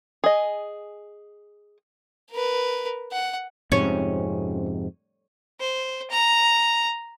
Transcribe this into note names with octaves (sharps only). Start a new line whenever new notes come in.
G#4 D#5
A#4 B4
F#5
F2 G#2 C3 C#4
C5
A#5